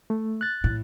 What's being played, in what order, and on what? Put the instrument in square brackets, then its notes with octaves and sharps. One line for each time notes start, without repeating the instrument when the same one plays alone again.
[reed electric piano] A3
F#6 A6
[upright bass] A2